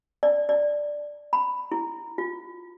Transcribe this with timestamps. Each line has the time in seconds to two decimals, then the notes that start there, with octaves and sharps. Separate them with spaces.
0.23 D5
0.49 D5
1.33 B5
1.72 E4
2.18 F4